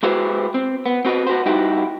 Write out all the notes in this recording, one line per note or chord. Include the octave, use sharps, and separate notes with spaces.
G#3 E4 F#4 G4 B4 C5
C4
B3
C4 F#4 B4 D#5
F#4 G4 B4 C5
G3 D#4 E4 F#4 G4